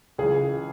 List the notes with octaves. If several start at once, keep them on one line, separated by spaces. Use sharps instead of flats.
C#2 C#3 E3 G#4